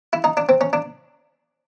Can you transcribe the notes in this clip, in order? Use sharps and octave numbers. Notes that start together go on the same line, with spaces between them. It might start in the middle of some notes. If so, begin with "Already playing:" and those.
E4
D#4
D4
C4
C#4
D4